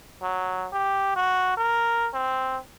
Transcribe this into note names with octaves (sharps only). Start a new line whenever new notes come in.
F#3
G4
F#4
A#4
C4